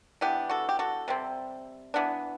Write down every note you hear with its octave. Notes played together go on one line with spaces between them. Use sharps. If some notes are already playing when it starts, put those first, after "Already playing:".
E3 B3 D4 E4 G4
F#4 A4
G4
F#4 A4
C3 G3 C4
E3 B3 D4